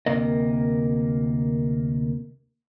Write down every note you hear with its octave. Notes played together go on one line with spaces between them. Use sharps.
D2 C3 A#3 A#4 D#5